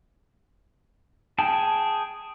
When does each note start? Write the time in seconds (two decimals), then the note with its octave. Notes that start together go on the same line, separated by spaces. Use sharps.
1.38 G#4 G5 A5